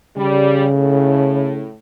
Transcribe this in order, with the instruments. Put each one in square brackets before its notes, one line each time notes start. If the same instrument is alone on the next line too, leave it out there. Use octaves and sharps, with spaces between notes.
[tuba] C#3 [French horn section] G3
[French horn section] A2